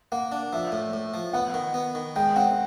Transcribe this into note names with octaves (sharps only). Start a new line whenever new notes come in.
A#3 F#5
D4
F3 E5
A2
A2
F3
B3 F#5
D#3
B3
D#3
G#3 G5
C4 F#5